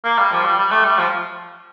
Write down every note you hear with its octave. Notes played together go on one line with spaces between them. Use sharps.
A#3
G3
F3
G3
G3
A3
G3
F3